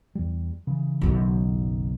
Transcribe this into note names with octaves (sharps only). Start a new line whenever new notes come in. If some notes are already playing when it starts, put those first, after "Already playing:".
E2 G3
C#3 E3
F#1 B1 F#2 D#3